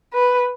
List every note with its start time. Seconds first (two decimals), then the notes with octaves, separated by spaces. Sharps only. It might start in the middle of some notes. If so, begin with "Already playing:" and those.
0.14 B4